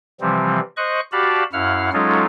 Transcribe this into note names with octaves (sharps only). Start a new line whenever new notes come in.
C3 E3 F3 G3 C4
C5 D#5 C#6 F#6
F#4 G4 D5 F5 A5 B5
F#2 E4 F5 F#5 F6
F#3 G#3 C#4 D#4 F4 A4